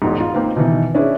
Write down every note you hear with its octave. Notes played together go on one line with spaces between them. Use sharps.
E1 G#2
F4
A#3 C4 D#4 B4
B2 D#3 E3 E4
C#4 D4 E4 G#4 B4